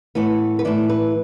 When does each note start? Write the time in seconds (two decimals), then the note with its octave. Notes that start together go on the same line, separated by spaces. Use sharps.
0.15 A2 E3 B3 F#5
0.59 B4
0.65 A2 E3 B3 D5
0.89 B4